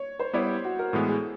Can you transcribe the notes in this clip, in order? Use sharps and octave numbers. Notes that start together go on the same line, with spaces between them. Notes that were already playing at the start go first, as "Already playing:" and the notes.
Already playing: C#5
C5
G3 B3 E4 G4 C#5
F#4
A#4
A2 E3 G#3 B3 A4
G#4